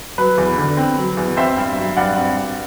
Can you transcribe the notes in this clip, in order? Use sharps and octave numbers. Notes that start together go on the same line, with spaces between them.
F#3 B4
E2
D3
C4
F#3
E2
C4 C5 E5
G2
F#3
G2 D5 F#5
C4
G2